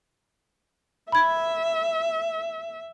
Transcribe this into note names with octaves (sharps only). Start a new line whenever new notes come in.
E5 B5 G#6